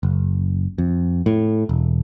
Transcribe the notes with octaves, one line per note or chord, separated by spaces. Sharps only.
F#1
F2
A2
E1